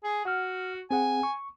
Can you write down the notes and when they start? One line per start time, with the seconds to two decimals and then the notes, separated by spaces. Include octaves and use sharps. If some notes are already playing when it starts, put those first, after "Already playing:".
0.04 G#4
0.25 F#4 F#5 F6
0.91 C4 G#4 F#5 G#5
1.23 C#6